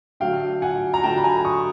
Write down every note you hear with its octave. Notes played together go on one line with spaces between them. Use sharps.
D3 F#3 A3 F5 G5
F#5 G#5
A#5
D3 F#3 A3 G5 A5
B5
G#5 A#5
C#6 D#6